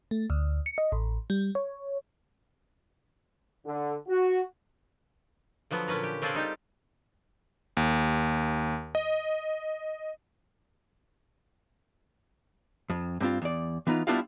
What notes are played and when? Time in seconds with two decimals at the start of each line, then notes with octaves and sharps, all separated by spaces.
0.11 A3
0.30 D2
0.66 C#7
0.78 D#5
0.92 A1
1.30 G3
1.55 C#5
3.66 D3
4.09 F#4
5.71 D3 F3 F#3 B3
5.88 A#2 D3 C#4 B4 A#5
6.03 G4
6.22 C#3 C4 D4 F4 G#4 A4
6.35 G3 D#4 G4 G5
7.77 D#2
8.95 D#5
12.90 F2
13.20 G2 C4 F4
13.42 E2 D5
13.87 E3 B3 D#4 F4
14.07 G3 B3 D4 E4 F4 F5